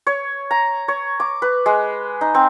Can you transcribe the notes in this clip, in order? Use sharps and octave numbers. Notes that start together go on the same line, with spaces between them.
C#5
A#5
C#5
D6
B4
G#3
D#4
C4